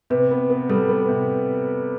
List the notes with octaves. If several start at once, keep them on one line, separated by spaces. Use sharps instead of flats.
C3 B4
B3
B3
G3 A4
B3
C3